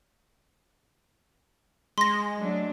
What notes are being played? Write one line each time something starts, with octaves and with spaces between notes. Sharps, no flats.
G#3 C6 A#6
F#3 A3 D4